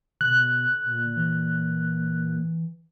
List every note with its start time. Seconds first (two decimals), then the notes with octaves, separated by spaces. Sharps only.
0.21 B2 D3 F#6
0.84 A#2
1.17 E3